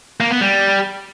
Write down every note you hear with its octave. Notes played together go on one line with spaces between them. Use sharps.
A#3
B3
G3